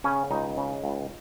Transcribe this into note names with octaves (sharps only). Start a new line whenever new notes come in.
C#3 C#4
C#2 D#4
C#3
C#2